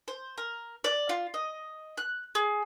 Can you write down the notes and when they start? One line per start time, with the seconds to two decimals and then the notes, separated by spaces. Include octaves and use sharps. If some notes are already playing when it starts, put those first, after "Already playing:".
0.08 C5
0.38 A#4
0.84 D5
1.09 F4
1.34 D#5
1.97 F#6
2.35 G#4